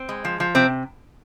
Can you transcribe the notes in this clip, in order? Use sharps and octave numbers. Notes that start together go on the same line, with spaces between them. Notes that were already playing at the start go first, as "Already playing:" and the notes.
Already playing: C4
G#3
F3
F3
C3 C4